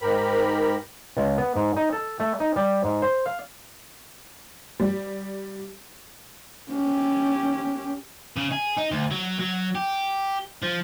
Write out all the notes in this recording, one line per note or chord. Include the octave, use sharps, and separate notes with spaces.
G#2 G4 A#4 B5
C#2
B3
G#2
D#4
A4
A3
D#4
G3
G#2
C5
F5
G3
C#4 G4
C#3
G#4
D#4
D2
F#3
F#3
G4
F3